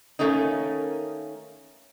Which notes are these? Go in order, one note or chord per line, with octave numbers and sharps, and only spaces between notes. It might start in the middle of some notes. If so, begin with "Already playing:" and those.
D#3 A3 A#3 C#4 D#4